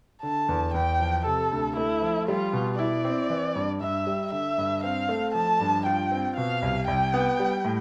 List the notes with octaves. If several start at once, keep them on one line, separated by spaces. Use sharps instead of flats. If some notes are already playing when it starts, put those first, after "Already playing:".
D3 A5
E2
E2 G5
F3
C3 A4
D2
A3 E4
F3
G3 F4
B2
E4 D5
C4
E3
G2
G2 E5
G3
D3 E5
G2
C4 F5
A3
F3 A5
G2
F4 G5
C4
B2 F5
C2
C2 G5
B3
G3
A2